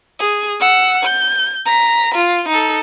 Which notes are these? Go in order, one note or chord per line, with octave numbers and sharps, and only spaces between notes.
G#4
F#5 E6
G6
A#5 B6
F4
D#4 A4